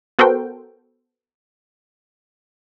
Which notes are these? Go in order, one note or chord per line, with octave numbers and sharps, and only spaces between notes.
B3 F#4 A4 A#4 C5 G5